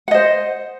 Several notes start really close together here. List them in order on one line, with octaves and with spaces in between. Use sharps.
F#5 D#5 C5